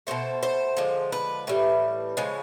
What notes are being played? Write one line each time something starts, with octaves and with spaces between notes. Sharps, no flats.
B2 F#3 A3 C5
C5
D3 F3 G#3
B4
A2 E3 G3
C#3 F3 G#3